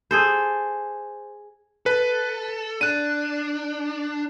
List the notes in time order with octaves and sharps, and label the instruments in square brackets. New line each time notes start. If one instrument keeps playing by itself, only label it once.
[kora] G#4 A4 C5
[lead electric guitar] A4 [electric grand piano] B4
[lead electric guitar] D4 [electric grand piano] F#6 D#7